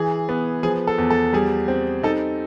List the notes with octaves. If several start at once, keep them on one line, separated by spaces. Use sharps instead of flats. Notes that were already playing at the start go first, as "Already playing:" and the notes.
Already playing: E3 G#4
B3
F3 G#4
A4
E2
A4
G3 G#4
C4
D#4 A4